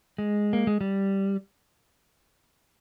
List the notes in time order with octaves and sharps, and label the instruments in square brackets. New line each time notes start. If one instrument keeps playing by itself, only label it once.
[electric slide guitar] G#3
A#3
G#3
G3